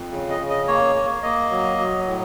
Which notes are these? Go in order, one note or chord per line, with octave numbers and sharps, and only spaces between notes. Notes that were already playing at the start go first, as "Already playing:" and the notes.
Already playing: F2
C#3
D#5
C#3
D#5
A#3 C#5
A#3
A#3 D#5
F#3
F#3
A2